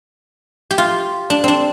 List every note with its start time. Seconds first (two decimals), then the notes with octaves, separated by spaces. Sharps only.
0.71 G4
0.78 F4
1.30 D4
1.44 C4 D4